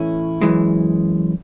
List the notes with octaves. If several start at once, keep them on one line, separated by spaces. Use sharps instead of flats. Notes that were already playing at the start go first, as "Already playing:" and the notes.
Already playing: A2 E3 A3 C#4 E4
F#2 E3 G#3